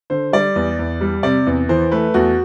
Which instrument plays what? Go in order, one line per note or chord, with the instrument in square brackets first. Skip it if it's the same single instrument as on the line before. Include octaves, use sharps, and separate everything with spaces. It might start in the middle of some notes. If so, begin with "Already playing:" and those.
[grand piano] D3 C5
G3 D5
E2
E2
G3
C3 D5
E2
E3 C5
A3 B4
E2 F#4